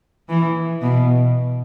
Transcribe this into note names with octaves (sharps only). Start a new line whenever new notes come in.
E3
B2